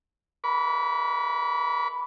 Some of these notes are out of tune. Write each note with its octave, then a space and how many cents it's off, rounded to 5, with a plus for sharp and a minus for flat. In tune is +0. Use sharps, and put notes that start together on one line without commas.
A#4 +45 B5 +0 D6 -45